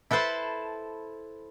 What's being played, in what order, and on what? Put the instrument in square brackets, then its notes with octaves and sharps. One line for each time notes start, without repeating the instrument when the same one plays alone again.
[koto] E4 A4 B4 C5 A5